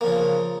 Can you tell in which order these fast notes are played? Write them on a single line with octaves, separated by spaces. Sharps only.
A#3 F3 C#3